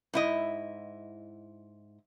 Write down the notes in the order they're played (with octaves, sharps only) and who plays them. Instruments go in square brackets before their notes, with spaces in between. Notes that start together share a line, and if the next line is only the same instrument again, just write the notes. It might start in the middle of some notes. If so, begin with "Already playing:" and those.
[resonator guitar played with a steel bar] G#2 E4 D#5